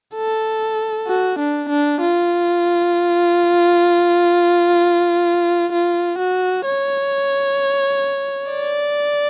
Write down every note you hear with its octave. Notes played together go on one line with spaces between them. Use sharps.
A4
F#4
D4
D4
F4
F4
F#4
C#5
D5